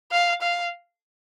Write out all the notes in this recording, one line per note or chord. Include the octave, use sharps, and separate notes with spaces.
F5
F5